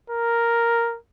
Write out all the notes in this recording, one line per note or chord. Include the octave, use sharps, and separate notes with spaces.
A#4